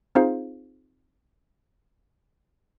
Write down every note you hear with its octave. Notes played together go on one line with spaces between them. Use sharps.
C4 D#4 F4 G#4 C5 F5